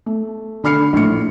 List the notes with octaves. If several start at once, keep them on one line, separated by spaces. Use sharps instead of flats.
A3
D3 B5 F6 C7 C#7
A#1 A2 C#7